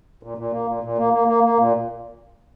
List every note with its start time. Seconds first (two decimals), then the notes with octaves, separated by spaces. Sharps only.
0.23 A#2
0.38 A#2
0.52 A#3
0.68 A#2
0.84 A#2
0.98 A#3
1.13 A#3
1.28 A#3
1.44 A#3
1.59 A#2